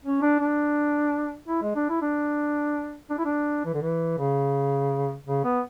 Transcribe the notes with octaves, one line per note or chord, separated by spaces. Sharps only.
C#4
D4
D4
E4
G#3
D4
E4
D4
D4
E4
D4
E3
D3
E3
C#3
C#3
B3